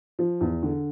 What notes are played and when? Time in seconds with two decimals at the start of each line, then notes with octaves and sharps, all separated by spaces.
0.19 F3
0.41 E2
0.63 D3